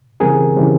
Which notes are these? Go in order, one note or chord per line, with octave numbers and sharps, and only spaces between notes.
C#3 E3 G3 C4 G#4 A#4
C#3 E3 G3 C4